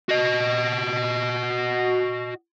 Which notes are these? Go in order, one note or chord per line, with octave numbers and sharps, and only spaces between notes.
F#4 D#5